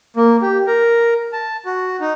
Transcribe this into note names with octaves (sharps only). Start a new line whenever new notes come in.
A#3
G4
A#4
A5
F#4
D#4